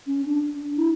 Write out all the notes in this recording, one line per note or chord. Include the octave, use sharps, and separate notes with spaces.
C#4
D4
E4